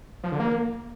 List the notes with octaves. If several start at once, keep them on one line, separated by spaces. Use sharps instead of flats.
F3
D3
A#3